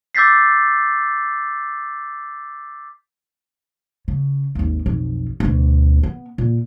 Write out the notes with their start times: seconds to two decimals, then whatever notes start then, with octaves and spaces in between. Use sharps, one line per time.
0.15 D6 E6 G6 A6 B6 C7
4.08 C#3
4.55 G#1 D#2
4.86 B1 F2
5.40 D2 B2
6.03 B3
6.38 A#2